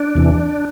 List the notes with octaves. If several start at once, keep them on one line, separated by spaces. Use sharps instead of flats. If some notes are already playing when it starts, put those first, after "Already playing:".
Already playing: D4
E2 C3 E3